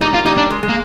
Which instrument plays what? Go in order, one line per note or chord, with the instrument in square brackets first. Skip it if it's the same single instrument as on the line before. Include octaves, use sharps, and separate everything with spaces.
[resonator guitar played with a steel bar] G3 A#3 [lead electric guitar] D#4
[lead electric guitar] F4
[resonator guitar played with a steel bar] G3 A#3 [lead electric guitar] D#4
[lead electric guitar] D4
[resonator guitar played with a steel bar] G#3
G#3
[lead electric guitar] A#3